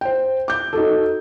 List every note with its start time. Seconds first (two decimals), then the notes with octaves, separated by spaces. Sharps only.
0.01 C5 G5
0.48 D6 G6
0.73 D#4 F#4 A4